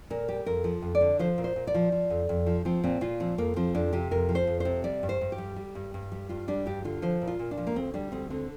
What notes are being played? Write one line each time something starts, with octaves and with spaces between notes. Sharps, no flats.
A#2 A#4
G3 G4
F2 A#4
F3
F2
D5
D3
F3 C5
A#2
C5
A#2
D5
F3
F3
F2
F2
F3
F3 C4
A#2 C4
A#2 F4
F3 C4
F2 A#3
F3 C4
F2 D4
C3 G4
F2 A#4
F3
C5
F2
C3 C5
G3 D5
G2
C5
G2
G4
G3
G3
G2
G2
G3
G2 F4
G3 D4
G2 G4
D3 F4
F3 C5
A#2
F4
A#2
D4
F3
A#3
D2 C4
G3 D4
D2 C4
D3 C4